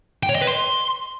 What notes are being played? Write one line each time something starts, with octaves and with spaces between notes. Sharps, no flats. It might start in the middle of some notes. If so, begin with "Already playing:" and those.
G5
C#5
D#5
B4
C6